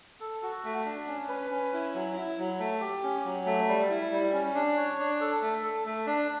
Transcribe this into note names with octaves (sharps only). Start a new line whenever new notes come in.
A4
F#4
A3
D4
C#4
B4
C#4
E4
F#3
E4
F#3
A3
G4
C#4
F#3
A3
G3
E4
G3
C#4
D4
C#5
D4
A4
A3
A4
A3
D4